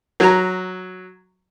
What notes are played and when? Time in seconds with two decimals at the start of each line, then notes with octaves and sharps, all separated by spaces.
0.20 F#3 A#5